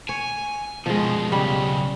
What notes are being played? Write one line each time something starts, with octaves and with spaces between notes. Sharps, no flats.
C#5 G#5
B2 D#3 F3 G#3
B1 C#3 G3